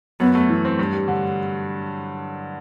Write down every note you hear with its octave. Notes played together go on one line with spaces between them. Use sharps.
F#2 B3
A3
E3
C4
G2
G3
D3